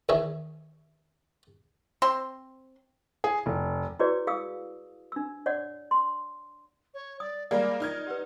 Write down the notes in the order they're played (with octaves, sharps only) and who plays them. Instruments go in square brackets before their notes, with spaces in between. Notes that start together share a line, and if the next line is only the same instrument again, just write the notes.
[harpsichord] E2 D#3 G#4 C#5 E5
[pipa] C4 C6
[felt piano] G#4
F1
[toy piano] E4 F#4 G#4 B4 C#5 D5
G#4 F5 D#6 E6
D4 E6
C#5 D5 F#5
C6
[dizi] C#5
[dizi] D5 [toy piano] D#6
[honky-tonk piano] G3 G#3 A#3 [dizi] A#4 [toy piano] D5
[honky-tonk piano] D#4 F6 G#6
[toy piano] G4 B4 [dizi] F#5